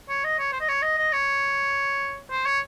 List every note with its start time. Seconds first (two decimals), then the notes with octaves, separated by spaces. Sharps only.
0.09 C#5
0.24 D#5
0.39 C#5
0.53 C5
0.61 D#5
0.68 C#5
0.82 D#5
0.98 D#5
1.12 C#5
2.31 C5
2.46 C#5